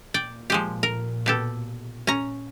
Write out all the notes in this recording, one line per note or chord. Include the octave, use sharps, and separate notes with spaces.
A#2 D5 G5
F3 G#3 G4
A#4
B2 G4 A4
C#4 A#5